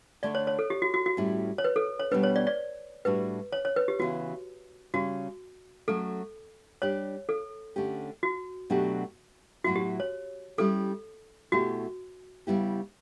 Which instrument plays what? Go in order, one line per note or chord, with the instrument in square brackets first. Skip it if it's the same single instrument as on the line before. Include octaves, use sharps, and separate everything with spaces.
[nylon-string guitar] D3 A3 D4 [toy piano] D5
[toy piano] C#5
C#5
A4
G4
F#4
F#4
F#4
[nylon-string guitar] A2 G3 C#4 E4
[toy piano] C#5
B4
A4
C#5
[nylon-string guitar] B2 G3 B3 D4 [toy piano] B4
[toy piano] C#5
D5
D5
[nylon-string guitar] A2 G3 D4 F#4 [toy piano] B4
[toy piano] C#5
C#5
B4
G4
[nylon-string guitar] C#3 E3 B3 [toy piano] F#4
[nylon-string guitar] C#3 G3 C#4 [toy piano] F#4
[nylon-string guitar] F#3 A3 C#4 [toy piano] A4
[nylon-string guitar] G3 D4 G4 [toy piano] C#5
[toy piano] A4
[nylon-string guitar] D3 A3 C#4 G4
[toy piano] F#4
[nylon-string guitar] B2 F#3 A3 D4 G4
[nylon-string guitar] A2 F#3 B3 E4 [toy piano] F#4
[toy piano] G4
C#5
[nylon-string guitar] G3 C#4 E4 G4 [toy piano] A4
[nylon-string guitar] B2 A3 E4 G4 [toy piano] F#4
[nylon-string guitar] C#3 G3 B3 E4 G4